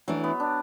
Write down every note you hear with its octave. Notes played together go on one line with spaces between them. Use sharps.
E3 F#3 A3 D4
B3
D4